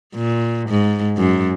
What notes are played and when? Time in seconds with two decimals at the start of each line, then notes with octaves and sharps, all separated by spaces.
0.15 A#2
0.69 G#2
1.17 F#2